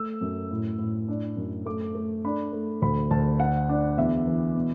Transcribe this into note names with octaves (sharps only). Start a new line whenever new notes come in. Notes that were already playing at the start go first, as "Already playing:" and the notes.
Already playing: A3 E6
F#2
A2
A2
D4
F#2
A3 D6
A3
D4 B5
A3
D2 B5
D2 A5
D4 F#5
D4
E2 E5
E3
B2